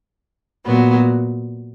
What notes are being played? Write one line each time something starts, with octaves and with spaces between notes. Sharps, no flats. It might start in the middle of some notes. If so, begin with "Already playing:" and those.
A#2 F#3 B3